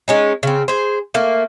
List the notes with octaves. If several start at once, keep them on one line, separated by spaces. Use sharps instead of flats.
G#3 C#4 D#4
C#3 C4
G#4 C5
A3 A#3